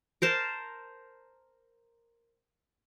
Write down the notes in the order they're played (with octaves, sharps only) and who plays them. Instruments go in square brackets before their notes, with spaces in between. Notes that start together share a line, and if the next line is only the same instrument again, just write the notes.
[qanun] A#4 C5 A5